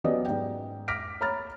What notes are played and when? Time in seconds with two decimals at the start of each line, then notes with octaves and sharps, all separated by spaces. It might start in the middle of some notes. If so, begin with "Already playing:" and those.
0.04 F#3 B3 C#4 G4 D5 D#5
0.26 G#2 G5
0.88 D6 F6 A#6 B6 D7
1.21 C#5 A#5 B5 F6 A6